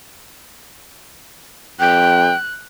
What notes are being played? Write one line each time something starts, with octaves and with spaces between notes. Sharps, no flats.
F2 G5 F#6